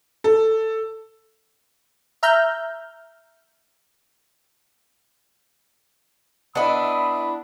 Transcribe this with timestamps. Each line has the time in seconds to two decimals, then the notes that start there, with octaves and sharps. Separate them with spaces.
0.24 A4
2.23 E5 A#5 F6 G6
6.55 B3 D4 E4 D#5 E5 B5 C6 D#6